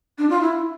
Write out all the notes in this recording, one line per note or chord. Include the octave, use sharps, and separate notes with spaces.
D4
F4
E4